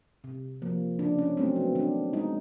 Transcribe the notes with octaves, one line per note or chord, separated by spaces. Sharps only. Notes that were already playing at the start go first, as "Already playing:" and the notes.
C3
F3 A#3
C#3 D4
C#4
F#3 A3 C4
B3
D#3 D4
G#3 D#4